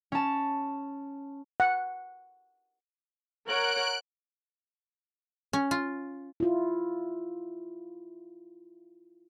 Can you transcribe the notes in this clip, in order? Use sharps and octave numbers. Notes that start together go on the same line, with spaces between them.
C#4 A5
F#5
A#4 C#5 F#5 F#6 D7
C#4
F4
E4 F4